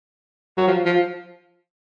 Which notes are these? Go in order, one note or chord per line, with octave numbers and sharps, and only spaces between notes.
F#3
F3
F3